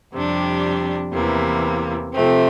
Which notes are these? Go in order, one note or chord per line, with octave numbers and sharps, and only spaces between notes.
F2 C3 G3 D4
E2 C3 E3 A#3
C3 F3 A3 C4